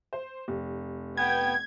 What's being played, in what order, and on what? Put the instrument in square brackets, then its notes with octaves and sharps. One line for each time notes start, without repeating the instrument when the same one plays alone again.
[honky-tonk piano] C5
F1
[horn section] B3 G5 [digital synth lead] G#6